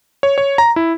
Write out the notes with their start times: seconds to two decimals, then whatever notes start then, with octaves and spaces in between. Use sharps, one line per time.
0.23 C#5
0.38 C#5
0.58 A#5
0.76 E4